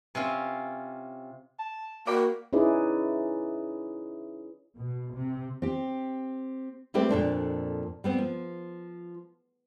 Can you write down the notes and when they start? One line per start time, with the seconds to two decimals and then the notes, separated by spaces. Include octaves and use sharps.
0.15 C3 C#4 F4
1.59 A5
2.07 A#3 F#4 D5 G5 B5
2.53 C#4 D#4 E4 G#4 B4 D5
4.77 B2
5.14 C3
5.62 C4 G4
6.94 G3 A3 C4 G4 B4 G5
7.09 F2 A#2 D4 A4
8.04 G3 B3 C4
8.18 F3